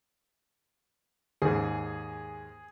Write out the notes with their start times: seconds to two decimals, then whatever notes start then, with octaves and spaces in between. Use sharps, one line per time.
1.42 D#2 G#2 G#4